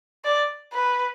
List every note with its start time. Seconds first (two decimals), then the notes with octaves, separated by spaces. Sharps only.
0.24 D5
0.73 B4